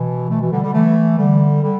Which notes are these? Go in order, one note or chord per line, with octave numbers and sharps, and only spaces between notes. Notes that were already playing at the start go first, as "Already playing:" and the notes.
Already playing: B2 E3
E3 A3
B2 E3
D3 G3
D3 G3
E3 A3
D3 G3
D3 G3